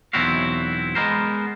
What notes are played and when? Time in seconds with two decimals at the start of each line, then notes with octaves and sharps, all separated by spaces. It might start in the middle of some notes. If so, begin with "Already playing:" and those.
0.13 B1 E2 C4 E4 F#4 F5
0.95 G#3 B3 A#4 C5